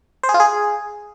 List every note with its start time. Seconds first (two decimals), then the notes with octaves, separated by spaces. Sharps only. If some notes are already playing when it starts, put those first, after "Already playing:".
0.23 C5
0.29 G#4
0.34 F4
0.40 G#4